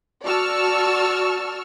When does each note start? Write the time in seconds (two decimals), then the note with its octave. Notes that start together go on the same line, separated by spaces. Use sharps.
0.24 F#4 D5 A5 C#6 E6 F6